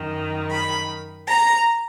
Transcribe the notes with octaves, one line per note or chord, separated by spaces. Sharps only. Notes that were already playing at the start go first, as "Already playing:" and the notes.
Already playing: F#2 D#3
B5
A#5